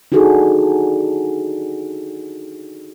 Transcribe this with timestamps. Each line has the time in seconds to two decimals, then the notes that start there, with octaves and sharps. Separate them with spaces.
0.12 D4 D#4 F#4 G#4 A4